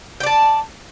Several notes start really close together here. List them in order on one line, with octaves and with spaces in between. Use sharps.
G5 D5 A5